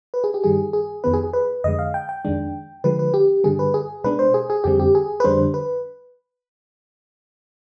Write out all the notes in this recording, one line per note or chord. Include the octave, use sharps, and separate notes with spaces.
B4
G#4
G4
G2 D#3 G3 G#4
G#4
F2 D#3 B3 B4
G#4
G#4
B4
F2 D3 G#3 D#5
F5
G5
G5
F2 D#3 G#3 D4
D3 F3 G#3 B4
B4
G4
G2 D3 G3 G#4
B4
G#4
B2 G#3 D4 B4
C5
G#4
G#4
F2 D3 G3 C4 G4
G4
G#4
B4
F2 D3 G3 D4 C5
B4